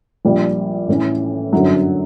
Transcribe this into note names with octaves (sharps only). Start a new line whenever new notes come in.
A#1 A#2 G3
A2 E3 A3 C#4
G1 F#2 D3 F#3